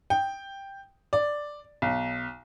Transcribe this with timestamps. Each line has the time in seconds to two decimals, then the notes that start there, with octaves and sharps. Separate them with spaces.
0.10 G5
1.13 D5
1.82 B1